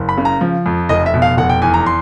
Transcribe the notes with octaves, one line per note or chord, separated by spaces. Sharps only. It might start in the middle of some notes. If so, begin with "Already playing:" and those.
Already playing: F#1
B5
C#3
A#5
F3
F2
F1 D#5
E5
B2
F5
F1 F#5
G5
E2 G#5
A#5
C6